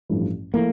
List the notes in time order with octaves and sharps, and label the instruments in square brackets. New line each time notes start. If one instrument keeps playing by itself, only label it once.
[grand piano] A1 G2 F3 A3 E4
[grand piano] F3 A3 E4 [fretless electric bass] A#3